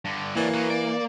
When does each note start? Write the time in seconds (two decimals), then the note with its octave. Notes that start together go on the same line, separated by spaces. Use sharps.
0.05 G2 D3
0.36 E3 F#3 A#3 D4
0.54 F#3 B3
0.70 D5